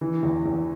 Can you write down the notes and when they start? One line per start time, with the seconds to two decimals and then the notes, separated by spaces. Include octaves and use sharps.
0.01 E3
0.23 E2
0.46 E2